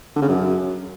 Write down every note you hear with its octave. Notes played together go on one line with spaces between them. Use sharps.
D3
C#3
F#2